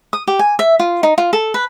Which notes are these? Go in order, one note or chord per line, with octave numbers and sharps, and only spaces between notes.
D#6
G4
G#5
E5
F4
D#4
F4
A4
B4